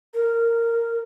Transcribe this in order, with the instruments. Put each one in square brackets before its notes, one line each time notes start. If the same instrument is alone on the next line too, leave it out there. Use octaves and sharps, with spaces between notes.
[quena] A#4